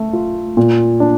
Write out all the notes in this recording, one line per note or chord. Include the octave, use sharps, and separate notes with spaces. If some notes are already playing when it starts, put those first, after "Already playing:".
Already playing: A3
F4
A#2
D4